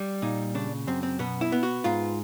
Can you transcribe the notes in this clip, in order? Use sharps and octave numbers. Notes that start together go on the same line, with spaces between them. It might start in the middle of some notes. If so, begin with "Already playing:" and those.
Already playing: G3
A#2 D#4
C#3 D4
F#2 C4
C4
B2 B3
E4
B3
F#4
G#2 F4